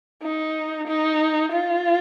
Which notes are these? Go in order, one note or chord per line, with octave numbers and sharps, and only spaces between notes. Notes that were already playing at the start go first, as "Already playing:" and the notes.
D#4
D#4
F4